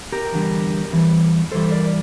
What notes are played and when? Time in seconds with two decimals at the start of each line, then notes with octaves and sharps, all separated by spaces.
0.12 G4 A#4
0.32 E2 D3 G3
0.92 E2 E3 G3
1.52 G2 E3 G3 A4 C5
1.72 A#4 D5